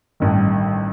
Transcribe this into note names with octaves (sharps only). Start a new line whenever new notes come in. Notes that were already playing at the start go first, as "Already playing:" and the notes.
A1 G2 D#3